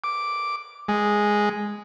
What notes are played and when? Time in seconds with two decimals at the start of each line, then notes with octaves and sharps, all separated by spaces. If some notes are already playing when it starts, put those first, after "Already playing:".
0.04 D6
0.88 G#3